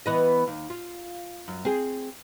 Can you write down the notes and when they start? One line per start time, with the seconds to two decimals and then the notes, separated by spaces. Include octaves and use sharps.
0.06 E3 B3 D#5
0.47 D#2
0.70 F4
1.48 F#2
1.65 C4 G#4